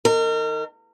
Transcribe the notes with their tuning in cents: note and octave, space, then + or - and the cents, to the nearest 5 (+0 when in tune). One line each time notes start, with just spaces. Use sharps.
D#3 +10 A#4 -35